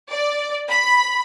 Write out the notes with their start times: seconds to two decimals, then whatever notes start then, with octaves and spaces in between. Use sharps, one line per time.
0.10 D5
0.70 B5